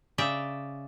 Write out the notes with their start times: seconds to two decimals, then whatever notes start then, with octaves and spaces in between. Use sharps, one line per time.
0.18 C#3 D5 E5 G5